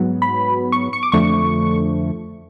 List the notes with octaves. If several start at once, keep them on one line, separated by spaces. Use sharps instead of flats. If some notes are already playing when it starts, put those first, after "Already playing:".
Already playing: G#2 F#3 B3
B5
C#6
C#6
D6
F2 D3 F3 A3 C#6